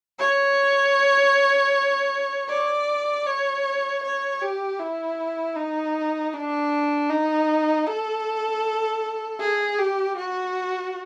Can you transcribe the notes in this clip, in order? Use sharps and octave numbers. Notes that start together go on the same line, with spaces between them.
C#5
D5
C#5
C#5
G4
E4
D#4
D4
D#4
A4
G#4
G4
F#4